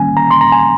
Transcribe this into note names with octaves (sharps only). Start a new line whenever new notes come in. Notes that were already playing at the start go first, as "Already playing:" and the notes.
Already playing: D#3 G3 A#3 C#4 G#5
A#5
C6
A#5
G#5